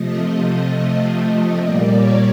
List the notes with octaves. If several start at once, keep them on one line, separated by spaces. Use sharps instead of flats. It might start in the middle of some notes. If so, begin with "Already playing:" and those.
Already playing: C3 F3 A3 D#5
C3 F3 A3
A#2 G3 A#3 D5
C#5